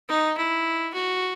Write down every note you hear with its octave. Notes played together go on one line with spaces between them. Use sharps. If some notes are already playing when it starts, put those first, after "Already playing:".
D#4
E4
F#4